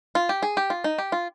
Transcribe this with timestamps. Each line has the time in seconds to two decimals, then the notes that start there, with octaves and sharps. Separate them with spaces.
0.15 F4
0.29 G4
0.43 G#4
0.57 G4
0.70 F4
0.84 D#4
0.98 G4
1.12 F4